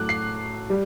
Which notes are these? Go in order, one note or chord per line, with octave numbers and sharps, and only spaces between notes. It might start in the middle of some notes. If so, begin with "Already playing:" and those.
Already playing: A2 F#3 A3 D6 F#6
C7
G3